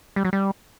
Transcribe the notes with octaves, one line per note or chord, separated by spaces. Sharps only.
G3
F#3
G3